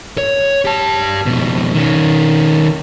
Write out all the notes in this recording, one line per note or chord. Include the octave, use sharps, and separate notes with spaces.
C#5
G4 A5
F2 B2
D#3 C#4